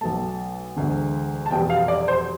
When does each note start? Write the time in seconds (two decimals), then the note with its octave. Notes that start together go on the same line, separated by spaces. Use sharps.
0.01 B1 B2 A3 A5
0.76 E1 D2 D3
1.46 A5
1.51 F1 E2 B2 G3 G5
1.70 F5
1.88 D5
2.08 C5